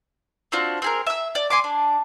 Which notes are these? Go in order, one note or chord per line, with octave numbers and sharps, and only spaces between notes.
C4 D4 F4 F#4
C4 G#4 A#4
E5 E6
D5
G#5 C6 D6
D4